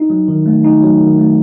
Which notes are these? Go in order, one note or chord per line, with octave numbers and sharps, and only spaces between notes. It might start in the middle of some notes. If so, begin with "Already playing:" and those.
Already playing: D#4
F#3
D#3
A3
D#4
F#3
D#3
A3